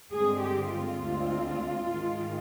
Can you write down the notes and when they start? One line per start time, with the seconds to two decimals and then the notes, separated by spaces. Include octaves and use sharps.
0.12 G2 D3 G#3 C4 G#4
0.40 G4
0.70 F4
0.99 D2 D3 G#3 C4
1.85 G#2 D#3 G#3